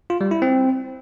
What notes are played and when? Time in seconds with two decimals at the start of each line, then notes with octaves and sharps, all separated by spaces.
0.10 F4
0.21 G3
0.31 E4
0.42 C4